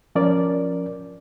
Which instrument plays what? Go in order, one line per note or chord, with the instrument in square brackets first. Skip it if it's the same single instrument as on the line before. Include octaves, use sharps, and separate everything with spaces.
[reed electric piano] F3 C#4 A#4 D5